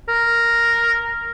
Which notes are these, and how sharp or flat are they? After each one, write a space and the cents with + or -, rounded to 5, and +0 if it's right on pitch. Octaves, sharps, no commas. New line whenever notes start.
A#4 +0